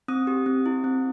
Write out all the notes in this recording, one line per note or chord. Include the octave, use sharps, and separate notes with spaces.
C4 D#6
G4
C4
E4
C4